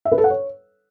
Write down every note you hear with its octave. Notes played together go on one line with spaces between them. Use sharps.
E5
B4
A4
F#5
C#5